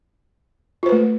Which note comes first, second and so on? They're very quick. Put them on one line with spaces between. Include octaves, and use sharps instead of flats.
F4 C5 B4 A3